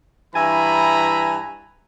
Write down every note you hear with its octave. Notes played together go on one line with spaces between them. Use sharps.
G2 E3 E5 G#5 A#5 B5